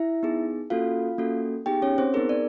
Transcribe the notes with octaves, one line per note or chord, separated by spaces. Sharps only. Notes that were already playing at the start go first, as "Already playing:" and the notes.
Already playing: E4 E5
B3 D#4 G#4
A#3 C#4 F4 F#4 A4 F5
A#3 C#4 F#4 A4
B3 D#4 G4 G#4 G5
C#4 C#5
C4 C5
B3 D#4 G#4 A#4
D5